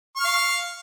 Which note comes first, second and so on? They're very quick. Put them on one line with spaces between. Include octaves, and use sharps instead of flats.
C#6 F6 F5